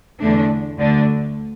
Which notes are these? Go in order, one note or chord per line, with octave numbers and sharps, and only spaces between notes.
E2 D3 A3 D4
D2 D3 A3 D4